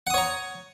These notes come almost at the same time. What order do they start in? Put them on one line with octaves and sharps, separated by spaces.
F#5 D#6 C#5 A#5